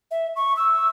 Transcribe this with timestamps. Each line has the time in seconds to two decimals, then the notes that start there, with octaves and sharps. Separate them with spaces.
0.11 E5
0.36 C#6
0.57 E6